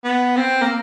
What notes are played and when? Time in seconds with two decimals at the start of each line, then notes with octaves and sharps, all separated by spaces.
0.05 B3
0.37 C4
0.62 A#3